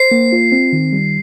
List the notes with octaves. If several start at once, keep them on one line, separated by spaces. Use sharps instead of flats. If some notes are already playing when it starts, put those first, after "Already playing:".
Already playing: C5 C7
A#3
F4
C4
D#3
G3